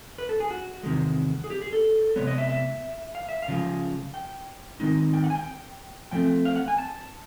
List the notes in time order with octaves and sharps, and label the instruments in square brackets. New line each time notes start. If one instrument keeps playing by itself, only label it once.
[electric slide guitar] B4
A4
G#4
F#4
E2 C3 D#3 G#3
G#4
G4
G#4
A4
C3 D#3 G#3 B3 C#5
D#5
E5
E5
F5
E5
F5
C#3 F3 G#3
G5
D#3 G#3 C4 D#4
G5
F#5
G#5
G5
A2 F3 A3 C4 G5
F5
F#5
G#5
A5